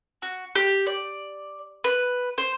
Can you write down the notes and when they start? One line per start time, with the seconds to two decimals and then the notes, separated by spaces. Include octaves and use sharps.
0.22 F#4
0.55 G4
0.87 D5
1.84 B4
2.38 C5